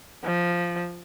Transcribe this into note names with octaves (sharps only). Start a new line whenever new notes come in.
F3